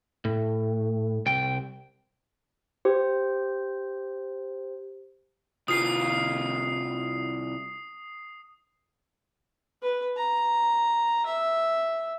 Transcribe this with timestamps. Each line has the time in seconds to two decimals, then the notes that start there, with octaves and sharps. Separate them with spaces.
0.25 A2
1.26 C2 G5
2.85 G4 C5
5.68 C2 F4 D#6 C7
9.82 B4
10.17 A#5
11.26 E5